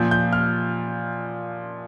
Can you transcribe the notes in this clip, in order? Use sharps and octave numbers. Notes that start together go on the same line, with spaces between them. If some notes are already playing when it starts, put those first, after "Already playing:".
Already playing: A#2 F3 G6
G6
F6